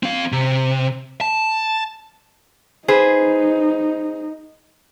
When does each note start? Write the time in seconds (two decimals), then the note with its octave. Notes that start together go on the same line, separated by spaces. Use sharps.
0.03 C4 F5
0.32 C3
1.21 A5
2.88 D#4 G#4 B4 C5